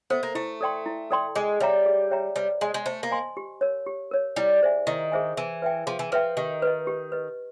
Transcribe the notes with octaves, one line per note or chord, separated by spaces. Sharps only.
B3 A4 C5 E5
A#3
A3 E4
A4 D5 G5 C6
E4
A4 D5 G5 C6
G#3 G#4
G3 C#5 E5 G5 A#5
G#4
C#5 E5 G5 A#5
G3 C5
G#3 D#5 G#5 C6
G#3
A3 C5
A#3
D#5 G#5 C6
G4
A#4 C#5
G4
A#4 C#5
G3 E4
G#4 C5 E5 G#5
D#3 E4
G#4 C5 E5 G#5
E3 G#4
B4 E5 G5
F3 G#4
E3
F3 B4 E5 G5
D#3 G4
B4 D#5
G4
B4 D#5